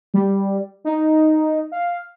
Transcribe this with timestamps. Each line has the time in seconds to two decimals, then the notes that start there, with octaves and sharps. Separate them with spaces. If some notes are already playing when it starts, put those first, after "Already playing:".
0.14 G3
0.85 D#4
1.72 F5